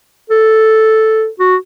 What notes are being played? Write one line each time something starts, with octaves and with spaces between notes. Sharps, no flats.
A4
F#4